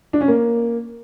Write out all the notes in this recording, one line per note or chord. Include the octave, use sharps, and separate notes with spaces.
D4
C#4
A#3